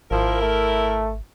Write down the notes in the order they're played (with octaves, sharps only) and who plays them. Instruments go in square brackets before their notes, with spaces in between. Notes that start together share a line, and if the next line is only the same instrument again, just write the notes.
[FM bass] G#1 [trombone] F3 [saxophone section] E4 A#4
[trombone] A3